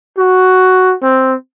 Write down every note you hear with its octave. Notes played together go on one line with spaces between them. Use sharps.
F#4
C4